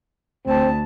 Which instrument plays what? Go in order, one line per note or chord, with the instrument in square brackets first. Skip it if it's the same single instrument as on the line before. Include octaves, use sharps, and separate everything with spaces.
[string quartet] D2 A5 [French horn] C4